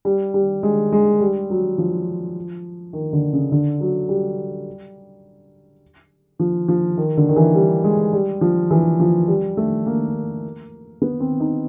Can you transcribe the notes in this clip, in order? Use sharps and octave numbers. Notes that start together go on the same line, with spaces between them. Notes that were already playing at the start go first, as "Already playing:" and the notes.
G3
G3
G#3
G#3
G3
F#3
F3
D#3
D3
C#3
D3
F#3
G3
F3
F3
D#3
D3
D#3
E3
G3
G#3
G3
F3
E3
F3
G3
A3
A#3
B3
C4
D#4